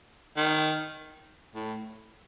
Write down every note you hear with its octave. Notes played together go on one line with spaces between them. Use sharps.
D#3
A2